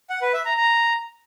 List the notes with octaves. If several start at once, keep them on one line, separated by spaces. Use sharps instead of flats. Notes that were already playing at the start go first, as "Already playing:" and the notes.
F#5
B4
E5
A#5
A#5